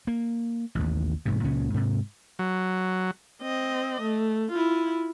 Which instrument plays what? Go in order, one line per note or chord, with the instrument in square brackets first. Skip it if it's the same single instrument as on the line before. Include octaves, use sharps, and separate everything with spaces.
[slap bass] A#3
A1 D#2
E1 G#2 C3
C#2 A#2 C#3 C#4
G#2 C3
[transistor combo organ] F#3
[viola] C4 D#5
A3
E4 F4